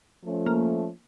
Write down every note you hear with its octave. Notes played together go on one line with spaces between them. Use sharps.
F3 A3 C#4
A#3